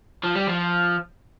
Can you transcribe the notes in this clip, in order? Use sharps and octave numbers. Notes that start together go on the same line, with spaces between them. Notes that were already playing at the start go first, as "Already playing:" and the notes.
F3
G3
F3